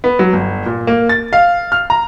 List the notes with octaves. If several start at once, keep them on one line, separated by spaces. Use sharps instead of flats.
B3
F#3
G1
A#2
A#3
A6
F5
F6
A#5